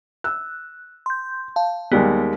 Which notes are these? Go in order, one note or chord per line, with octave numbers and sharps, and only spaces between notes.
E6 F#6
C6 G6
F5 A5
D#2 G3 G#3 B3